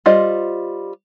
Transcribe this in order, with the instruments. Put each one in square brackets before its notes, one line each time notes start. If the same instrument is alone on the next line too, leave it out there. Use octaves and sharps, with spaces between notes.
[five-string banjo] G3 F4 C5 D#5